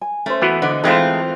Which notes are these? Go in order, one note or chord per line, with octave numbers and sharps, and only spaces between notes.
G#5
A3 C#4 C5
E3 B3 F#4
D3 C5 D#5 F#5
E3 G#3 A3 C4 F4